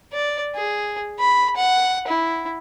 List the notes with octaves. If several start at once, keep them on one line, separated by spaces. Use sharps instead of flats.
D5
G#4
B5
F#5
E4